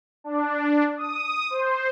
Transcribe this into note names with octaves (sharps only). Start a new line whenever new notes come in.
D4
D#6
C5